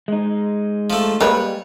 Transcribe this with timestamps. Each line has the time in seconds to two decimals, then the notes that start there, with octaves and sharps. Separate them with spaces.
0.08 G#3 D#4
0.90 F3 A3
1.21 G3 G#3 A#3 B4 C#5